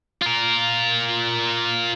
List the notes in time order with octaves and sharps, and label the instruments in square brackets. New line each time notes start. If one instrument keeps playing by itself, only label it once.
[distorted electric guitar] F4 A#4